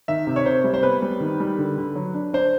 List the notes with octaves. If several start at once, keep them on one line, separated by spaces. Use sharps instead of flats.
D#3 E5
C3
C#5
C3 C5
G3
C5
B3 B4
G3
D#3
G3
D3
D3
F#3
D4
D4 C5